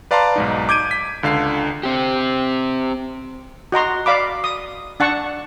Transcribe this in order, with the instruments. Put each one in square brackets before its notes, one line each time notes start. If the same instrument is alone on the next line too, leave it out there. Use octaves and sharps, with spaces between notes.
[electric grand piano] B4 D5 F5 A5 A#5 C6
B1 G#2 D#4
D6 G6 G#6 D7 D#7
B6
C#2 D3 F5 C7
[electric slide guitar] C4 G4
[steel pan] F#4 D#5 A#5 C6
D5 F5 B5 D6
D#6
D4 F#5 A5 C#6